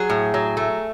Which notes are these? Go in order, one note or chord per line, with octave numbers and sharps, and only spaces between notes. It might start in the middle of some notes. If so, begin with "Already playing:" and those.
Already playing: F#3 G#4
A2
F#3
A3